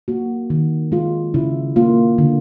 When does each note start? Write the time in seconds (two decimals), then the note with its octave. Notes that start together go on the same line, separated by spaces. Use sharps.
0.08 A#3 F#4
0.50 D#3
0.92 G#3 F4
1.34 C#3 E4
1.76 A#3 F4
2.18 D3